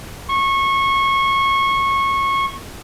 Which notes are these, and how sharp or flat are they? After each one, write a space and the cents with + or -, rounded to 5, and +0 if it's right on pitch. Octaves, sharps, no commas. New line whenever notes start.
C#6 -20